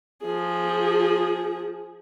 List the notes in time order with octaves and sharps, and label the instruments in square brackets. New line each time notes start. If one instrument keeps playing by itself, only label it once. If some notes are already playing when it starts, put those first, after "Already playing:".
[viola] F3 G#4